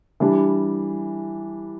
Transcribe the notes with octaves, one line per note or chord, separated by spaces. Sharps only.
E3 G3 D4